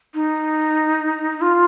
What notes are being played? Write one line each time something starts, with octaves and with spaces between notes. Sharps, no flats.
D#4
F4